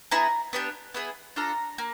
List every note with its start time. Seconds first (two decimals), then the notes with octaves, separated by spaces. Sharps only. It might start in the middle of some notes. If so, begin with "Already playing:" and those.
0.11 B3 E4 G#4 A#5
0.53 B3 D4 G4
0.94 B3 E4 G#4
1.36 D4 F4 A4 A#5
1.78 A#3